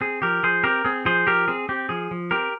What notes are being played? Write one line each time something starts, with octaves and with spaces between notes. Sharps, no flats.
C4 G#4
F3 G4 A#4
F3 G#4 C5
C4 G4 A#4
C4 G#4
F3 G#4 C5
F3 G4 A#4
C4 G#4
C4 G4
F3 G#4
F3
C4 G4 A#4